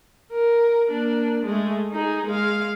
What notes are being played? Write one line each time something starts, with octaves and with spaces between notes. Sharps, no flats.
A#4
A#3 D4
G#3 A3
D#4 G#4
G#3 F5